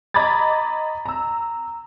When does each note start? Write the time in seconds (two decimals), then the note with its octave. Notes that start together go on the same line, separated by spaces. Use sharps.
0.14 D#5 A#5 B5 D6 G#6 A6
1.06 A#5 E6